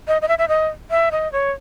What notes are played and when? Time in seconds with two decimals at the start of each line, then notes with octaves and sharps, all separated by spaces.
0.08 D#5
0.22 D#5
0.28 E5
0.38 E5
0.48 D#5
0.90 E5
1.11 D#5
1.32 C#5